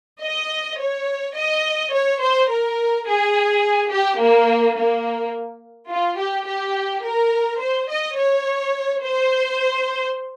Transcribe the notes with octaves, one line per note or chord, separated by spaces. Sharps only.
D#5
C#5
D#5
C#5
C5
A#4
G#4
G4
A#3
A#3
F4
G4
G4
A#4
C5
D#5
C#5
C5